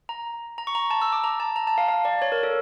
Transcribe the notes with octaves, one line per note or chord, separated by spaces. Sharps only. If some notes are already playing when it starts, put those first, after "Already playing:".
A#5
A#5
C#6
A#5
A5
E6
D6
A#5
A5
A#5
A5
F5
F5
D5
C#5
A#4
A4